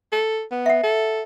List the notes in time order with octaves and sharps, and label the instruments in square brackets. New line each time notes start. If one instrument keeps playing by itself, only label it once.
[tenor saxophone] A4
B3
[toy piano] E5 F#5
[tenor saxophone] A4